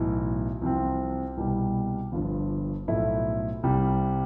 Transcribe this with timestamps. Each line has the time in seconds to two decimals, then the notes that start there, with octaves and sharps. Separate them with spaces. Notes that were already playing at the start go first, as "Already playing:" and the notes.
Already playing: B1 A2 E3
0.62 C2 C3 F3 C4
1.37 C2 B2 G3
2.12 G1 G2 D3 F3
2.88 B1 A2 F3 A3 E4
3.63 C2 C3 G3